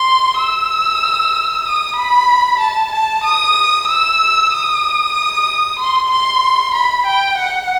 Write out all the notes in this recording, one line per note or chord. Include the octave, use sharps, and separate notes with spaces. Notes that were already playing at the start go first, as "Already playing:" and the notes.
Already playing: C6
E6
D#6
B5
A5
A5
D#6
E6
D#6
C6
C6
B5
G5
F#5